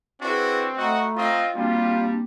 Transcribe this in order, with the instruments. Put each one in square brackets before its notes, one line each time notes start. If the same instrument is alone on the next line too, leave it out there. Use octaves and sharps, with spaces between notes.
[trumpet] C4 [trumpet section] D4 E4 F#4 [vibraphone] G#4 B4 D5
[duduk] A3 [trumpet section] F#4 D#5 F#5 [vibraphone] A#5 B5 C#6
[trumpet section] C4 D#5 [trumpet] F4
[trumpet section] G3 [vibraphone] A#3 C4 F#4 [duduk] D4 [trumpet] F4